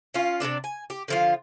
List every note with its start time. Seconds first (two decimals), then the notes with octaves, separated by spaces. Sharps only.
0.14 C#4 F4
0.40 C3 F3 D4 D5
0.64 G#5
0.90 G4
1.08 D3 F3 F4